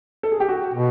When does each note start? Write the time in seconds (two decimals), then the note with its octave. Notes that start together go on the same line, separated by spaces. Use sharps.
0.23 A4
0.32 G#4
0.40 G4
0.49 F#4
0.74 B2